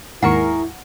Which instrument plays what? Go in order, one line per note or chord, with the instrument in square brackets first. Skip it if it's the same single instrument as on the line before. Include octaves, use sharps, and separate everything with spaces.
[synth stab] D#2 G#2 [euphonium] E4 [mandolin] G#4 A#4 C#6 [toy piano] F#5 A#5